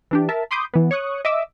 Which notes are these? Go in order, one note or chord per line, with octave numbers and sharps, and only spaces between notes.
E3 D4 G4
A#4 E5 A5
B5 C6 D6 D#6 G6
E3 B3
C#5 C#6 D#6 F#6
D#5 E5 D6 E6